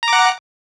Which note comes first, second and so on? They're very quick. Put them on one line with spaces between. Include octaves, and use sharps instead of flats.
A#5 D6 F#5